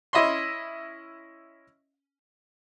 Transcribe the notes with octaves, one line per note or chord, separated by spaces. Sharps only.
C#4 E4 D#5 E5 B5 C6